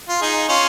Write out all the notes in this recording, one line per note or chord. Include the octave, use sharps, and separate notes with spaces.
F4
D#4 G#4
C#4 F4